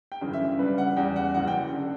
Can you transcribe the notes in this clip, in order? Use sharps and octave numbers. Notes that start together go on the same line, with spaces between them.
G5
G1 F#2 C#3 E3
E5
C#2 C#3 G3 B4
F#5
E2 C#3 G3 G5
F#5
F#1 F#2 E3 F#5
G5
D3